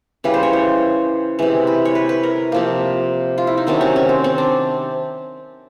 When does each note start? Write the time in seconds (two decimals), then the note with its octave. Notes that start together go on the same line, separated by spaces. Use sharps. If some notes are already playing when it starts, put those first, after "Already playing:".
0.24 C#3 E3 G3 B4
0.34 C5
0.43 C#5
0.53 C5
1.39 C3 E3 G#3
1.67 B4
1.85 C#5
1.95 B4
2.09 B4
2.23 A#4
2.52 C3 F3 A#3
3.38 F4
3.47 E4
3.57 D#4
3.67 C3 D#3 F#3 D4
3.81 C#4
3.96 C#4
4.09 C4
4.24 C4
4.38 D4